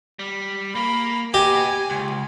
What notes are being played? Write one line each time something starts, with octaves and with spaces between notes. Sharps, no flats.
G3
A#3 B5
B3 G4 D#5 G#5
C#2